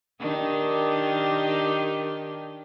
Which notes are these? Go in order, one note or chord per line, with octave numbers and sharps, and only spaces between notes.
D#3 D4 G4